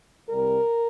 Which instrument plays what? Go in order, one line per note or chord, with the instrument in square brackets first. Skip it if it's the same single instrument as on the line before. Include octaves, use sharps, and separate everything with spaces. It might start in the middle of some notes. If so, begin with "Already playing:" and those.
[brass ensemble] C2 C3 G3 A#4